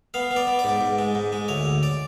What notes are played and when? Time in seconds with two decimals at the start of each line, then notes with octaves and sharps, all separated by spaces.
0.14 B3 F5
0.31 B3
0.36 D5
0.47 B3
0.59 D5
0.64 G#2
0.81 G#2
0.99 G#3
1.15 G#2
1.33 G#3
1.48 D2 C#5
1.65 D2
1.83 D5